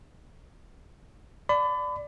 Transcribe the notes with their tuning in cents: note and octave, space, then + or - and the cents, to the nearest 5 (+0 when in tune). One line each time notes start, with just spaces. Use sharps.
D5 +0 B5 +35